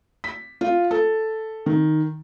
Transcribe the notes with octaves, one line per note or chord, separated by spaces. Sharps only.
B6
F4
A4
D#3